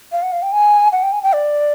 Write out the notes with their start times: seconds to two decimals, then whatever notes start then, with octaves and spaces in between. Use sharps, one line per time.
0.12 F5
0.22 F#5
0.32 F5
0.42 G5
0.52 G#5
0.92 F#5
1.03 G5
1.12 G#5
1.23 G5
1.33 D5